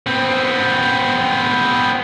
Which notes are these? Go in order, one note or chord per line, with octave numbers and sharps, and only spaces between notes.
B3 C4